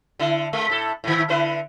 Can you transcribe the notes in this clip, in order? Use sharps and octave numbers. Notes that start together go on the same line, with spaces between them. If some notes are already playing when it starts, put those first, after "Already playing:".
D3 E4
G#3
A2 A4
A2 D#3
D3 E4 B4